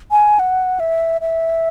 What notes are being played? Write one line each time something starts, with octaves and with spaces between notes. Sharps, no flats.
G#5
F#5
E5
E5